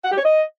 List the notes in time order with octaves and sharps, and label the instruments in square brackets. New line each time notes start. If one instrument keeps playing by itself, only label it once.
[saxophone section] F#5
G4
C#5
D#5